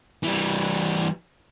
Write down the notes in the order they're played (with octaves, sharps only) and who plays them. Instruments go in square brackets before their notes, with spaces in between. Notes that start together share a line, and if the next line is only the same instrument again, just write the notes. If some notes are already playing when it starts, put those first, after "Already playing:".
[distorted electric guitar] E3 G3